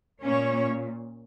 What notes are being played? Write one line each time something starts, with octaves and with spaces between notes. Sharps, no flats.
A#2 A#3 C#4 C#5